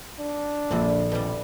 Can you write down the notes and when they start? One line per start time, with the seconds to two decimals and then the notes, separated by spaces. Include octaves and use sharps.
0.19 D4
0.71 A#1 D3 G3 C4
1.12 F2 B2 G3